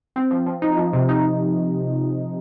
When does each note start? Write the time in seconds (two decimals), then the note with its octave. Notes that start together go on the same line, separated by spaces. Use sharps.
0.16 C4
0.31 F3
0.47 F3
0.62 D#4
0.77 F3
0.93 C3
1.09 D#4